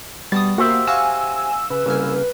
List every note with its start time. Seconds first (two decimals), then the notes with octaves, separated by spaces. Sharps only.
0.32 B2 G3 A5 D#6 A6
0.58 A#3 F#4 G4 A#4 C5 E5
0.87 F#4 F5 G#5 C#6 E6
1.70 C#3 B4
1.86 C2 C#3 A#3 G#5